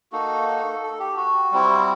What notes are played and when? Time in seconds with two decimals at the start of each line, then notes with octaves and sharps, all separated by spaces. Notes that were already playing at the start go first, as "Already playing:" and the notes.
0.12 A#3 D#4 F#4 A4
0.83 A4
0.99 G4
1.17 F#4
1.52 G3 C4 E4